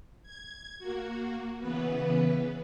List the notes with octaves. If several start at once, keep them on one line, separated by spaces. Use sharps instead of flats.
G#6
A#3 F#4
C#3 E3 B3 B4